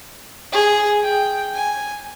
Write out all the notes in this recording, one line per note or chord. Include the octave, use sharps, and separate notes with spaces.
G#4
G5
G#5